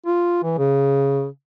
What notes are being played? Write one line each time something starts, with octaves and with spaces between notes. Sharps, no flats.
F4
E3
C#3